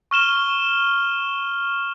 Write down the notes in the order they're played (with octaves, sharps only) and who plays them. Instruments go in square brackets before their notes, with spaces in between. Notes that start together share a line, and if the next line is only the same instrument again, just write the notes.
[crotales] C#6 F6 E7 G7